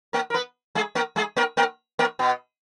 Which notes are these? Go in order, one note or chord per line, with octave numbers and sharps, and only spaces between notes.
A#3 A#4
A#4
B3 B4
G#3 G#4
A#3 A#4
G#3 G#4
A#3 A#4
A#3 A#4
A#3 A#4
B2 B3